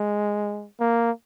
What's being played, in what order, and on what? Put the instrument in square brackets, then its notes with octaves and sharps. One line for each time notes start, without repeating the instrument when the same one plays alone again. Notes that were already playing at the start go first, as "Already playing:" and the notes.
Already playing: [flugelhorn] G#3
A#3